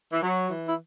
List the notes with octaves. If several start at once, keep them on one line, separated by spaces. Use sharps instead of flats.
E3
F#3
E3
E4